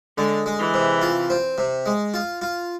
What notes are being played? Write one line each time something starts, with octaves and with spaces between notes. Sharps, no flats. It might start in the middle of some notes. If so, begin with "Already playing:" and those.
D3 G#3
G#3
E3
C3
F4
C4
C3
G#3
F4
F4